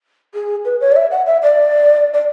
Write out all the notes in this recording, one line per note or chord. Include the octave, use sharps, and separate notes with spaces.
G#4
B4
C#5
D5
E5
F#5
E5
D5
D5